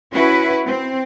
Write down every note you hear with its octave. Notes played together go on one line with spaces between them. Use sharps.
C#4 E4 F#4 B4
C4